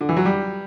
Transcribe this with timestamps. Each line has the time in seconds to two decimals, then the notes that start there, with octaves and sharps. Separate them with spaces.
0.01 D3
0.09 E3
0.17 F#3
0.25 G3